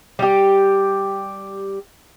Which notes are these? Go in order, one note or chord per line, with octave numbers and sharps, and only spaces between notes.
G3 G4